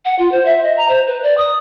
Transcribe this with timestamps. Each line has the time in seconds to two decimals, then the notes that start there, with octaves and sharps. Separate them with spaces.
0.05 F#5
0.19 F4
0.32 C5
0.45 E5
0.64 D#5
0.77 A#5
0.89 C5
1.07 B4
1.23 D5
1.37 D#6